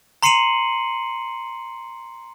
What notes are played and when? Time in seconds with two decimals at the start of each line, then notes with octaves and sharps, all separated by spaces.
0.23 A#5 C6 C7 C#7 D#7 F#7